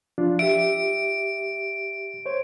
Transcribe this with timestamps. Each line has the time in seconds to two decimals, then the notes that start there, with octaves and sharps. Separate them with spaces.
0.18 F3 D4 F4
0.39 G4 E5 D7
2.26 C5 C#5